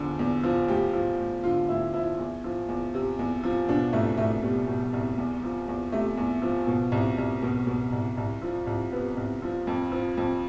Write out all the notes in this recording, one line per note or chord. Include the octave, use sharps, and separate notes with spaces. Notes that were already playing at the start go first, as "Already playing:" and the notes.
Already playing: E2 D3 F3
E2
F3
D2 G4
F3
D2
D3 F4
D2 E4
F3 E4
E2
F3
E2
C3
E2
F3
B2 D4
C2 A3
C2 A3
B2 G3
B2
C2
E2
F3
E2
C3 A3
E2
F3
B2
C2
C2
B2
B2
C2
C2
F3
C2
C3 B3
C2
F3
F2
F3
F2